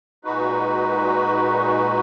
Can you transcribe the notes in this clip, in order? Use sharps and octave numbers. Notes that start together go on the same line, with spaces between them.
A#2 G#3 D#4 F#4 B4